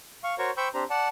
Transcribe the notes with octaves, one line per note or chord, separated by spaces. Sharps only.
F5 C#6
F#4 A#4 C5 C#5 C#6
C5 G5 B5 C#6 E6 G6
C4 D4 G4 C5 A#5
D5 F#5 A5